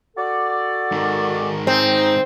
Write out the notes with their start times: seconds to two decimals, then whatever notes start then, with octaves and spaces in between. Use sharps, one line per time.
0.17 F#4 A4 D5
0.92 G#2 D#3
1.67 C4 D#4